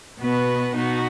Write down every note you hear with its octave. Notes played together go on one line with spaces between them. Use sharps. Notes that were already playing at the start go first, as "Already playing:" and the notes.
B2 B3 F#4 B4
B2 B3 D#4 F#4